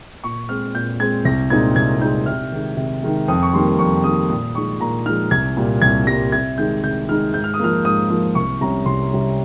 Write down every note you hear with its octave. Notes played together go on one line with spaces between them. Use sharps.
A#2 C#6
G#3 C4 F6
A#2 G6
G#3 C4 G#6
C2 A#6
A#2 G#3 C4 D#4 G#6
C2 G#6
A#2 G#3 C4 D#4 G6
C3 F6
D#3 G#3
C3
D#3 G#3
F2 D#6
C#6
D#3 G3 A#3 C6
F2 C#6
D#3 G3 A#3 D#6
A#2 D#6
F3 G#3 D#4 C#6
A#2 A#5
F3 G#3 D#4 F6
C2 G#6
A#2 G3
C2 G#6
A#2 G3 A#6
C3 G#6
D#3 G#3 D#4 G6
C3 G6
D#3 G#3 D#4 F6
G#2 G6
F6
D#6
F3 A#3 F6
G#2 D#6
F3 A#3
C2 C#6
C3 G3 C#4 A#5
C2 C6
C3 G3 C#4